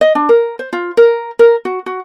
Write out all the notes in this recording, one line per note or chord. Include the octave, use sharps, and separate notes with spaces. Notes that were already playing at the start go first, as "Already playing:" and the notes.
D#5
D4
A#4
C5
F4
A#4
A#4
F#4
F#4